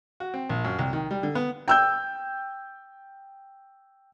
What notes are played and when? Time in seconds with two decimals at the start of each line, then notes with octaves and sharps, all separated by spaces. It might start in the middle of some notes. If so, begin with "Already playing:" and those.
0.20 F#4
0.34 C4
0.49 A#1
0.65 F#2
0.79 C2
0.93 D#3
1.11 G3
1.23 D3
1.35 B3
1.68 G5 E6 G6